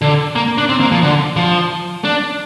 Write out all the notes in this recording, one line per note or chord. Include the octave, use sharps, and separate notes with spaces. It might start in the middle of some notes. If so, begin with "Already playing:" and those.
D3
A#3
D4
C4
A#3
F3
D3
F3
D4